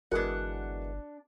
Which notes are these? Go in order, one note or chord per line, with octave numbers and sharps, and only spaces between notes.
G1 E3 G#3 B3 D4 F#4 A#4 F#5